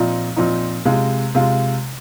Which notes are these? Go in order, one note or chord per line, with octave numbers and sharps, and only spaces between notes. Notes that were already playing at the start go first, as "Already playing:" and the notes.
Already playing: A#2 F3 C4 D#4
A#2 F3 C4 D#4
C3 G#3 F4
C3 G#3 F4